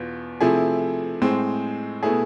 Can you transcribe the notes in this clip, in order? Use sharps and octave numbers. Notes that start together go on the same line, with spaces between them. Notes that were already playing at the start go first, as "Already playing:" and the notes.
Already playing: E2 B2 B3 F4
C3 F3 A3 E4 G#4
A2 G#3 C4
B2 A3 E4 G#4